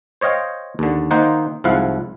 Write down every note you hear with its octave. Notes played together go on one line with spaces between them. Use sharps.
C5 C#5 D#5 F5 G5
D#2 D3
D#3 A#3 D#4 C5 F#5
C2 G#2 F3 E4 F5 F#5